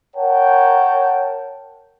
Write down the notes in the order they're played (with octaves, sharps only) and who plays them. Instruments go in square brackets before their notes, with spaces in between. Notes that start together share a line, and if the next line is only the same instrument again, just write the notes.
[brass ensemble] A#4 C#5 F#5 G5 A5